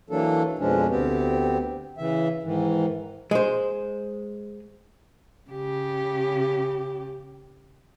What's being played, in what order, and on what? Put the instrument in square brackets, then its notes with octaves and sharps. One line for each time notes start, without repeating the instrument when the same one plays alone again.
[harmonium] E3 F#3 A#3 D4 A4
F2 B2 F3 G#3 C#4 D4
D2 B3 C4 G4
C#3 E3 E5
G#2 D#3 E3
[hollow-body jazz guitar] G#3 C5
[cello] C#3 G4